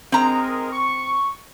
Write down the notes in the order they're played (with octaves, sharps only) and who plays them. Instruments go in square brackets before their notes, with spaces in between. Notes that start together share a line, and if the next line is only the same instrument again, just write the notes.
[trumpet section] G#3 D#4 A#4 [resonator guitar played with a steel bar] C4 A#5
[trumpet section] C#6